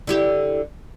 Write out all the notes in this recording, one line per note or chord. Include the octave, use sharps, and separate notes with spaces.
D3 E4 G4